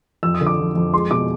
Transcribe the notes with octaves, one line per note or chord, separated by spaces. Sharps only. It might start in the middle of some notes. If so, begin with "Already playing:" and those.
F2 E6
D#6
D3
D6
F2
F2
G#3 C6
B2 D6